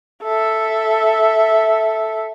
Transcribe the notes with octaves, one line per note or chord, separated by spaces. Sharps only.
A4 E5